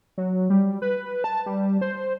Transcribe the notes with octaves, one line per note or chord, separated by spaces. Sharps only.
F#3
G3
B4
A5
G3
C5